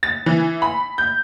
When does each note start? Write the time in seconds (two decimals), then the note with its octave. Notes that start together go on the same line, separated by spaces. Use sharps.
0.03 A6
0.26 E3
0.62 B5
0.98 G6